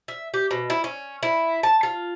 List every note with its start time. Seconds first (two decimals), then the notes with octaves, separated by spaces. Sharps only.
0.08 E5
0.34 G4
0.51 B2
0.70 E4
0.84 C#4
1.23 E4
1.63 A5
1.83 F4